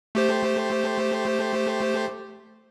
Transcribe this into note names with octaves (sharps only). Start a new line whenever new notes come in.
A3 G4 C5